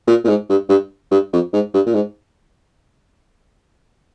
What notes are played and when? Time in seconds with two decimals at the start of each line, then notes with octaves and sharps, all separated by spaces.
0.07 A#2
0.24 A#2
0.28 G#2
0.50 G2
0.69 G2
1.11 G2
1.33 F2
1.53 G#2
1.74 G2
1.86 A#2
1.94 G#2